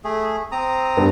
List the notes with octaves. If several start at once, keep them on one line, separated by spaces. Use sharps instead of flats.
A3 G#4
C4 A#5 D#6
G2 B3